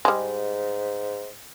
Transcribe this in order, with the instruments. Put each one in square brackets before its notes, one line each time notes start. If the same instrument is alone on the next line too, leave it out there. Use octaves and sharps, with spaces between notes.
[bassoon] G#2 [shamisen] G3 G#3